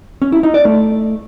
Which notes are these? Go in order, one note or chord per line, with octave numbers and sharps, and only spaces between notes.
C#4
E4
D#4
D5
A3